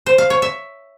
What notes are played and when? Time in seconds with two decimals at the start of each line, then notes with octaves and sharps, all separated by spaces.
0.06 C5
0.18 F5
0.30 C#5
0.42 E5